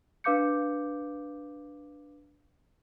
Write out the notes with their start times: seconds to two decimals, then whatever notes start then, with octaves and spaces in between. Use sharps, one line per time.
0.24 D4 B4 F5 D6 G6 C#7